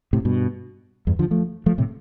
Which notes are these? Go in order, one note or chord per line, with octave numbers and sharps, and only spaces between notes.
A2 C3
G2 B2
E2 G2
D3 F3
F3 A3
F3 A3
A2 C3